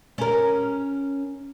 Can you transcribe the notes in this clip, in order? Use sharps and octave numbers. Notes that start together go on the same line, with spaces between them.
C#4 A#4